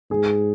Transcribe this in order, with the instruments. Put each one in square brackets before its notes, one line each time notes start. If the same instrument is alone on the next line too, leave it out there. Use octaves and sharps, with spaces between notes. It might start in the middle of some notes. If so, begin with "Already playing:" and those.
[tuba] G#2 [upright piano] G#4